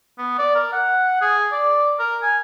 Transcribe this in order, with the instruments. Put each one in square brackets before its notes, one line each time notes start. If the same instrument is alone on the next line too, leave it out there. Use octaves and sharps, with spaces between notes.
[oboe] B3
D5
A#4
F#5
G#4
D5
A#4
G#5